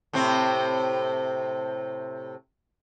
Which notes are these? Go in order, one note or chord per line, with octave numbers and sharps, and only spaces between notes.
A2 C3 C4